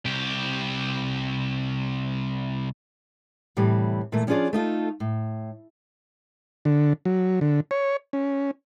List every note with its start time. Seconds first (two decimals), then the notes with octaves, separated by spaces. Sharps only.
0.06 C2 G4
3.57 A2 C3 E3 G3
4.12 A#2 E3 A3
4.27 F3 C#4 D4 F4 G#4 D5
4.53 A3 D#4 F4 A4
5.00 A2
6.65 D3
7.05 F#3
7.41 D3
7.71 C#5
8.13 C#4